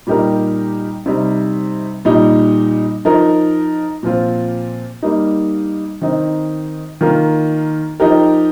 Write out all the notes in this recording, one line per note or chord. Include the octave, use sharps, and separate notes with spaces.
A#2 G3 D#4 G4 A#4
C3 G3 D#4
A#2 G3 D#4
F3 D#4 A#4
A#2 F3 C4 F4
G3 A#3 D#4
D#3 C4 D#4
D#3 A#3 F4 A#4
F3 D#4 G4 A#4